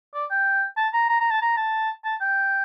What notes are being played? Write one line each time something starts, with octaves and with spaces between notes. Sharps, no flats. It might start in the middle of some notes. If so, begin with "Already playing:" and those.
D5
G5
A5
A#5
A#5
A#5
A5
A#5
A5
A5
G5